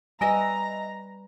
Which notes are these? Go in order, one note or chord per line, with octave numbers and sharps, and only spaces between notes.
G3 B4 D#5 E5 G#5 A#5 E6